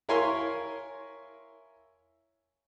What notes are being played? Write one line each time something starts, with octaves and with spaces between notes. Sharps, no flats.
E4 A#4 C#5 F5 G#5 C6